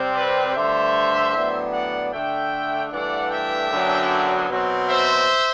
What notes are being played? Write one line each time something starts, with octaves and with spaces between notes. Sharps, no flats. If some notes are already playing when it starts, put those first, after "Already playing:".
Already playing: C3 G3 C4
B4 D5
G2 D3 A3 C5 E5
A2 F#3 B3 D4
D5 F#5
D3 A3 D4 E5 G5
G2 E3 A3 D4 D5 F#5
E5 G5
F#2 D3 F#3 B3 D4
B2 F#3 C4
C5 E5